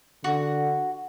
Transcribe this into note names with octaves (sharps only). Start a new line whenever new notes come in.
D3 F#4